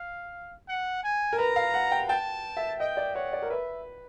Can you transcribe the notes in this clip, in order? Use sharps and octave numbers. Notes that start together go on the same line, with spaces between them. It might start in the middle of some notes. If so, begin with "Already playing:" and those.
Already playing: F5
F#5
G#5
A#4
B4 A#5
F5
F#5
G5
G5 A5
E5
D#5 G5
D5
C#5 F#5
D5
A#4
B4 E5